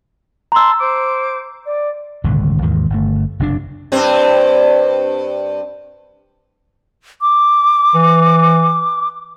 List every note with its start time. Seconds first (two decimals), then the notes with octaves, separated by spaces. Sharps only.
0.52 A5 A#5 C6 E6
0.79 C5 D6
1.65 D5
2.24 D#1 G#1 C#2 D3
2.62 D#2 G#2 D#3 E3
2.90 G1 A3
3.39 F#1 C3 C4 D4
3.92 G2 C4
7.21 D6
7.95 E3